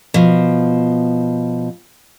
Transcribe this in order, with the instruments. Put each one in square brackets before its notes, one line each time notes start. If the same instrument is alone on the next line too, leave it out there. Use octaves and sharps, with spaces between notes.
[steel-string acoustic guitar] B2 F3